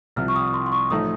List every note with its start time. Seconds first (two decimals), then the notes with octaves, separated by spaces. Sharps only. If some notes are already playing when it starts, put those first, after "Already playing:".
0.16 C2 C3 F3 F6
0.28 C#6
0.36 D#6
0.54 C6
0.66 C6
0.72 C#6
0.90 A1 A2 F3 A3 D#4 D#6